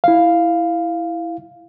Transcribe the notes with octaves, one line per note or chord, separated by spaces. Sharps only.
E4 F5